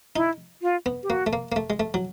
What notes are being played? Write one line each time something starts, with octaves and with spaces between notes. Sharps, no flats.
D#4 E4
F4
B3
G4
A#3 F#4
A3
A#3
A#3
A3
G#3
A3
F#3